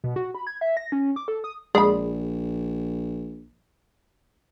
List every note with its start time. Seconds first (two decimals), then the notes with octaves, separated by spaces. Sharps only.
0.04 B2
0.16 F#4
0.35 B5
0.47 G#6
0.61 E5
0.77 A#6
0.92 C#4
1.16 D6
1.28 A4
1.44 D#6
1.75 A#1 G#3 D5 B5